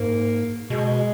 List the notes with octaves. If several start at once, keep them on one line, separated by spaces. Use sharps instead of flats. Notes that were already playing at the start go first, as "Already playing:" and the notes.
Already playing: G#2 A#3
B2 G#3